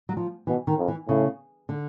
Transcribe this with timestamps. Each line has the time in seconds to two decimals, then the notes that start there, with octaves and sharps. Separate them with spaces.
0.09 F#3
0.17 F3
0.47 B2 E3
0.67 D#3
0.78 F2
0.88 E3
1.08 A2 C#3
1.69 D3